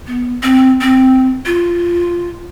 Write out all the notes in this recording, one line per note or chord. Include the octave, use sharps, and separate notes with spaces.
B3
C4
C4
F4